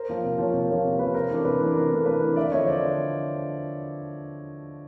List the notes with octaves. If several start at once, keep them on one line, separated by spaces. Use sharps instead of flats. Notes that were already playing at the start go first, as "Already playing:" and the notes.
Already playing: A#4 C5
F3 A#3 C#4
C3
F3 A#3 C#4
C3
F3 A#3 C#4
C3
F3 A#3 C#4 B4
C3 A#4 C5
E3 A3 D4
C3 B4
E3 A3 D4
C3 A#4
E3 A3 D4
C3 B4
E3 A3 D4
D3 D5 E5
E5
F3 A3 C#5 D#5
D3 C5 D5